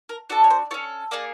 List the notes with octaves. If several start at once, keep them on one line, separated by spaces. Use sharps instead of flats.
A#4
D4 F#4 A4
C#5
C5
C#4 F4 A4 C#5
A#3 D#4 G#4 D5